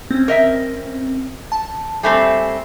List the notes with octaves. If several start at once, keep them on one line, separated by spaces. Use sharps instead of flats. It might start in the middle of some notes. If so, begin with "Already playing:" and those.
C4 C#4
A#4 D#5 E5
A5
G3 A3 C4 G#5 C7